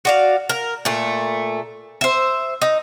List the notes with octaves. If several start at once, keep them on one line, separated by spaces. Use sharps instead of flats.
F#4 D5 F5
A#4
A#2 A3
C5 E5
D#4